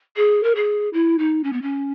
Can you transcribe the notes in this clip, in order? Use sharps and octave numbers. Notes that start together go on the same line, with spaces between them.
G#4
A#4
G#4
E4
D#4
C#4
B3
C#4